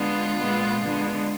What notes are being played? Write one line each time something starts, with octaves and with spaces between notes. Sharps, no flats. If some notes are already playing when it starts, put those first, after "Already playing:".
Already playing: D3 G#3 B3 F4
A#2 G#3 B3
D3 G#3 B3